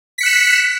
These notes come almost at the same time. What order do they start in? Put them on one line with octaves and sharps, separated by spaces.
B6 C#7 F#6 E7